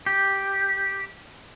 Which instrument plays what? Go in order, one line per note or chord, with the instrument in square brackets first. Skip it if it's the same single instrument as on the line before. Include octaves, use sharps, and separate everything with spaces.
[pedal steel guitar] G4